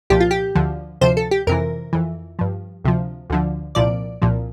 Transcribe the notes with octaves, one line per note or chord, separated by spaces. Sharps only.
C2 A#2 F3 G4
F4
G4
D2 D3 F3
D2 C3 F3 C5
A4
G4
F2 C3 E3 A#4
F2 E3
G2 F3
D2 C3 F3
D2 D3 F3
C2 A#2 F3 D5
C2 A#2 F3